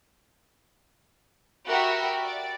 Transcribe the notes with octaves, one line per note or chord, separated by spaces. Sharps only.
F#4 G4 A#4 E5 F#5 B5
D5